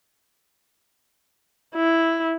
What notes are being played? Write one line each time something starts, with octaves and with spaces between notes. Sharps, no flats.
E4